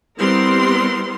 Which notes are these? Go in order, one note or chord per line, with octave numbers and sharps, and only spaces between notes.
G3 B3 C4 E4 A#4 C6